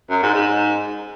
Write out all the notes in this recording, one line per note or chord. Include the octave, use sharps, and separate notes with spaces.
F#2
G#2
G#2